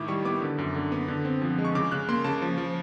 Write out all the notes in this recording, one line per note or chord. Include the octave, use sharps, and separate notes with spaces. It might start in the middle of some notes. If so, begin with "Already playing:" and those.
Already playing: A2 D#3 E4 D6
G3 C#6
B3 D6
D3
F#2
D3
B3
D3
C4
F3
G#3
C#6
C#3 D6
C#3 F#6
A#3 C6
C#3 A5
F3
F3